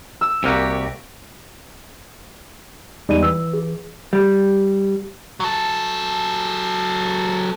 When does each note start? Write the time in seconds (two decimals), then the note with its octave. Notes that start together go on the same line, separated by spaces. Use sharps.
0.21 E6
0.44 C2 C3 A#3 F#4 G4
3.09 E2 G3 G#3 D#4 D#7
3.23 E3 E6
3.53 G#4
4.13 G3
5.40 F#3 A4